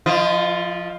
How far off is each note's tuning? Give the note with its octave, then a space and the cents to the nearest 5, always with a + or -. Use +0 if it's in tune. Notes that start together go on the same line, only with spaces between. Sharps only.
F3 +10 F4 -45 D#5 +0